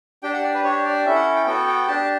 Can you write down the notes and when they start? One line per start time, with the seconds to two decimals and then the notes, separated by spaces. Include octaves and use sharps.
0.23 D4 G4 G5
0.33 F#5
0.44 D5
0.54 B4
0.64 D4 G4 C#5
0.85 D5
1.05 C#4 E4 A4 E5
1.15 F#5
1.36 G5
1.46 B3 F#4 A4 G5
1.67 G5
1.87 D4 G4 A5